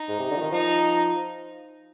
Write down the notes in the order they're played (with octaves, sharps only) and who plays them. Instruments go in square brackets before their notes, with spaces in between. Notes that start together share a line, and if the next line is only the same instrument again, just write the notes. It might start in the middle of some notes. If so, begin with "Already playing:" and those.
Already playing: [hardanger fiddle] D#4
[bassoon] G#2
C3
D3
F3
D#3
[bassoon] F3 [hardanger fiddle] D#4